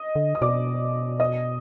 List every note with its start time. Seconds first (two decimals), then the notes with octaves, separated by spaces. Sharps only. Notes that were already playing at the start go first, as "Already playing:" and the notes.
Already playing: D#5 D#6
0.16 D3
0.35 D#6
0.41 B2 D5 D6
1.20 D#5 D#6